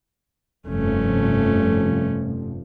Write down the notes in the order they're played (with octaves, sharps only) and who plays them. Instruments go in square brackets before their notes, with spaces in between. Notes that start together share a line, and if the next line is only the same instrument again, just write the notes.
[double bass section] F1 G2 F3 [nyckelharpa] A3 C#4